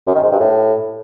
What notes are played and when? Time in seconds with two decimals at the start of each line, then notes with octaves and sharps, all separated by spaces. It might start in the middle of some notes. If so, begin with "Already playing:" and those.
0.06 F#2
0.15 D#3
0.23 G#2
0.32 G2
0.40 A2